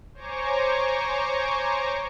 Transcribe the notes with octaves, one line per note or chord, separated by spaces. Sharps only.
C5 C#5 G#5 A#5 C#6 D6